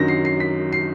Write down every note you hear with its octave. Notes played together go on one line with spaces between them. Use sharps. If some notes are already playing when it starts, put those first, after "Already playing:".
Already playing: F#2 D#3 F#3 A#6
C7
C7
B6
C7